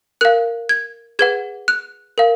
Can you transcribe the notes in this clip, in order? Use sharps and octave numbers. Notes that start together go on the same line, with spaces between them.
A#4 F5 F#6
G#6
G#4 B4 F#5 G#6
F#6
A#4 F5